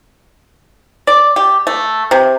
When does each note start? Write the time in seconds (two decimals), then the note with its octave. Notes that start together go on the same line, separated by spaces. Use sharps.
1.07 D5
1.36 G4
1.67 A3
2.11 C3